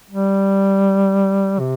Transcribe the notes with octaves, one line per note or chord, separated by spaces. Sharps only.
G3
C3